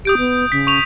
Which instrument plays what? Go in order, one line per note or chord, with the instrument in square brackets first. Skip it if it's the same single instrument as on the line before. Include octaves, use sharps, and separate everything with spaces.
[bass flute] G4 [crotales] D#6 G6 D7
[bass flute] B3
[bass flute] C#3 [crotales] B6
[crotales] C#6 F7